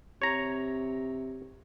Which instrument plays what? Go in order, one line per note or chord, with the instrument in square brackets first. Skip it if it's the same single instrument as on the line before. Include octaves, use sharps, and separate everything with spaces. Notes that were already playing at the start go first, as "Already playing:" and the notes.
[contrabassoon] C3 [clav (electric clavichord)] C#5 A#5